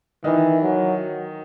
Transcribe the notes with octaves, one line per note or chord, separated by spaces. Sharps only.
D#3 E3 D#4
F#3